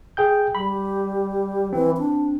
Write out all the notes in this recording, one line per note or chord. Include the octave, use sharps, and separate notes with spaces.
G#4 G5 G6
G3 B5
E3 C4
D4